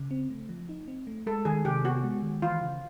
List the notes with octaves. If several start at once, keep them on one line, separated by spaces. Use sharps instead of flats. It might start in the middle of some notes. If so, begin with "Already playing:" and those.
Already playing: C#3
C4
A3
F3
D#4
C4
A3
G#3 A4
D#3 G#4
C3 G4
B3 F#4
G#3
D#3
E3 F4
C#3